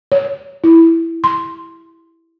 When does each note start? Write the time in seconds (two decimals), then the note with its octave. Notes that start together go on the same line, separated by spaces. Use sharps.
0.12 C#5
0.64 E4
1.24 C6